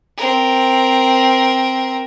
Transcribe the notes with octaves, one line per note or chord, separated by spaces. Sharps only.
C4 A#4